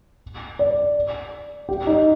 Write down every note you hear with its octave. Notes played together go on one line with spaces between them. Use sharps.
D5
G4
D#4